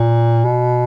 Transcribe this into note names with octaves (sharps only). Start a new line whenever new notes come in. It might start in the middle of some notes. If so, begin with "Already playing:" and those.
Already playing: A#2
B2